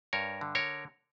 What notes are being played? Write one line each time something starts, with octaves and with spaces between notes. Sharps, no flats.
G2 A#4 C#5
D3
A#4 C#5